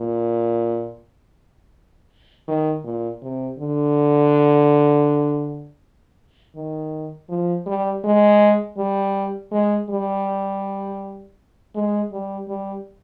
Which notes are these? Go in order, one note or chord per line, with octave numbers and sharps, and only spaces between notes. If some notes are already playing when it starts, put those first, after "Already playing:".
Already playing: A#2
D#3
A#2
C3
D3
D#3
F3
G3
G#3
G3
G#3
G3
G#3
G3
G3